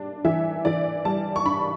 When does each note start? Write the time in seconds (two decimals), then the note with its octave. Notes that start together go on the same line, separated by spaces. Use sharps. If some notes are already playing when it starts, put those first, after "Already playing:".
Already playing: G3 D4
0.25 E3 E5
0.65 E3 D5
1.05 G3 A5
1.36 C#6
1.45 D4 B5